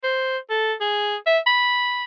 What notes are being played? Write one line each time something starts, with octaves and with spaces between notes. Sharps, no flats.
C5
A4
G#4
E5
B5